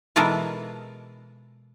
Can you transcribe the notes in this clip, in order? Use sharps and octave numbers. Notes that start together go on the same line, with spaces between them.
B2 E3 G#3 F4 A4 A#4